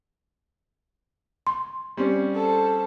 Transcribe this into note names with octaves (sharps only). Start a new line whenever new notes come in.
C6
G3 C4 C#4
A4 C5